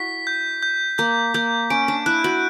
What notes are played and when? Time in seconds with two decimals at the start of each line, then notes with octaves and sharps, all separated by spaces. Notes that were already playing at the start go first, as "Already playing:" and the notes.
Already playing: E4 F#4 B6
0.27 G6
0.63 G6
0.98 A#3 G6
1.34 A#3 G6
1.70 C#4 D7
1.88 D4
2.06 E4 F#6
2.24 F#4